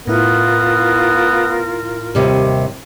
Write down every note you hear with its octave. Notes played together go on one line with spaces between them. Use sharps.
A2 B3 E4 F4 A#4
D#2 C3 G3